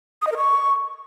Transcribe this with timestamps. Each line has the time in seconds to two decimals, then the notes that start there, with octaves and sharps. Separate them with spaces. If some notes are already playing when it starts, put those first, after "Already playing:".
0.22 D#6
0.27 D#5
0.32 A#4
0.37 C#6